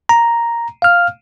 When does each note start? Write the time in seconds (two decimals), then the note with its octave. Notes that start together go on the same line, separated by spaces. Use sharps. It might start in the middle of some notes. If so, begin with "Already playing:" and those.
0.09 A#5
0.82 F5 F6